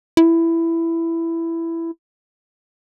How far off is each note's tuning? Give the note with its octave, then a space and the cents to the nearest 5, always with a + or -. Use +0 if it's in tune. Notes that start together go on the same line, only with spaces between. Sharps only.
E4 +10